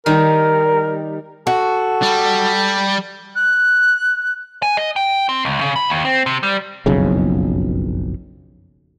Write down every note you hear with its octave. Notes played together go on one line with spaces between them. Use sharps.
D#3 G3 A#4
F#4 A4
G3
F#6
G#5
D#5
G5
C4
C#2
C#3
B5
D#2
C4
C3
G3
F#1 B1 F2 C#3